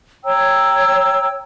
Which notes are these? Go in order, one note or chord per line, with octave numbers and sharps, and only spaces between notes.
C#5 G5 A#5 E6